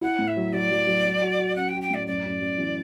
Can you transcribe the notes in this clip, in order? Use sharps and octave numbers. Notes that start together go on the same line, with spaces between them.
E4 F#5
A2
E5
F#3
F#3 D5
F#3
F#3
F#3
F#4
F#4
C#4 F#5
G5
F#4
G5
A2 D5
F#2 D5
F#2
F#2
E3